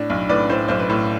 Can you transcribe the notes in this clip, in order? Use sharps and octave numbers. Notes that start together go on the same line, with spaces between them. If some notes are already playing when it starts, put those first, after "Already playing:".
Already playing: A2 D4
B1
A2 B4 D5
A2 C5
B1 C5
B4
A2